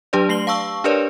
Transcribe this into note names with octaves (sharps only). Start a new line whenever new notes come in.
F#3 D4 G4 B4 D5
A3 C7 F#7 G7
F5 A5 C#6 E6
D4 G4 A#4 B4 C#5 D5